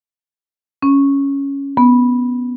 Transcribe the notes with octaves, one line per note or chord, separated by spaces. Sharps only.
C#4
B3